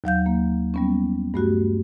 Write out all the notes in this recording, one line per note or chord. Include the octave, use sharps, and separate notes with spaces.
D#2 F#3 F5 G6
A#3
G3 B3 C#4
G2 A3 F#4 G4